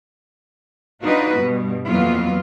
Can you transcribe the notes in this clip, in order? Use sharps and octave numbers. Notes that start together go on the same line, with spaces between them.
D4 D#4 F4 F#4 B4
G2 B2 G3
F2 E3 F#3 A#3 B3 F4